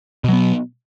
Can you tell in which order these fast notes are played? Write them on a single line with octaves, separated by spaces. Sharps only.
B2 F#3 B3